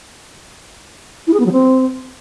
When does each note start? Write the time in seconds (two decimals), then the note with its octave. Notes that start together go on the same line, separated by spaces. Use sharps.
1.27 E4
1.34 G#4
1.40 B3
1.46 F#3
1.52 C4